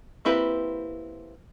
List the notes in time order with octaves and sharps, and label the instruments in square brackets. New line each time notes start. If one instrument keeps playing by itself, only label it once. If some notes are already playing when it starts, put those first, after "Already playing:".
[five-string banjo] A#3 C4 E4 G4 B4